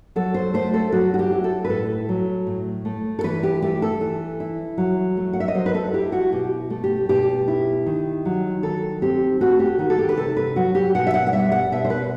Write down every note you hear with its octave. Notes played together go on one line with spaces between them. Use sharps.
F#3 A4
C5
A3 C5
A4
F#3 F#4
F#4
G4
E4
A4
B4
A2 A4
F#3
A2
A3
A4
E3 B4
G4
A3 G4
A4
E3
E4
F#3
A3
F#5
E5
D#5
F#3 C5
B4
A4
E4 G4
F#4
B2 G4
A3
G4
B2 G4
E4
D#3
F#3
D#3 A4
C4 G4
A3 F#4
G4
D#3 F#4
A4
G4
B4
C3 A4
B4
F#3 F#4
G4
B2 F#5
E5
F#5
F#5
G3 E5
F#5
B2 E5
C5
B4